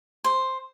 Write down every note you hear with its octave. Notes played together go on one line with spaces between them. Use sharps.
C5